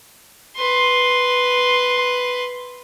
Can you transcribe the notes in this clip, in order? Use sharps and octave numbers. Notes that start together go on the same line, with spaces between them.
B4 C6